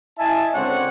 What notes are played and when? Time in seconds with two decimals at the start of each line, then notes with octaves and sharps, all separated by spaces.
0.18 E4 D#5 E5 G#5 A5
0.54 C#2 D3 C4 D4 C#5 F#5